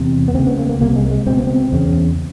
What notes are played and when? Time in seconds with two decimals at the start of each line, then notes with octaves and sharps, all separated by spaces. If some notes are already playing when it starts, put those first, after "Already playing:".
Already playing: E2 C3
0.28 B3
0.35 C#2 C4
0.39 C#3
0.47 B3
0.58 A#3
0.69 A#3
0.81 C2 C3 A#3
0.96 G#3
1.11 G#3
1.26 C#2 B2 C4
1.37 B3
1.47 C4
1.72 E2 C#3